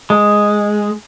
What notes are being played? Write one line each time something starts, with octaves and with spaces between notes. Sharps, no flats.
G#3